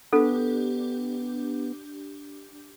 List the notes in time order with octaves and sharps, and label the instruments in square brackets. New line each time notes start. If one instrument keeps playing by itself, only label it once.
[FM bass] B3 [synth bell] D4 G4 [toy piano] A4